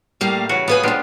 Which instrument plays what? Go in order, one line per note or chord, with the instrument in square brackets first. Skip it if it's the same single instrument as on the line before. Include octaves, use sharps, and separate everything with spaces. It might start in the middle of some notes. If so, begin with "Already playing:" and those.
[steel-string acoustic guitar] A2 G3 A#3 [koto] F5
[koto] C#3 F#4 [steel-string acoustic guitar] E3
[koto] B3 G#4 [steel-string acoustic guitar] F4 B4 G#5
[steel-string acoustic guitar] E2 F3 [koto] D4 F4 G4